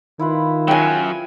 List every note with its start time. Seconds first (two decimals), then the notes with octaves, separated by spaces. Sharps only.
0.19 D#3 E4 F4 B4
0.68 F#2 F#3 G5 G#5